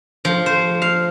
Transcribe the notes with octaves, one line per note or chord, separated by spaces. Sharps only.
F3
C5
F5